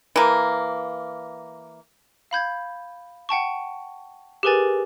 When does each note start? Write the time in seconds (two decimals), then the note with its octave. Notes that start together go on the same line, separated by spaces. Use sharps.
0.16 E3 A#3
2.31 F5 B5 G6 G#6
3.29 F#5 G5 A5 C#6
4.43 G4 G#4 A#4 B4 G#5 A6